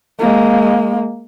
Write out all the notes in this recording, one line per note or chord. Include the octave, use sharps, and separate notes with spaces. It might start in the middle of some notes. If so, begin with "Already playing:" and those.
G#3 A#3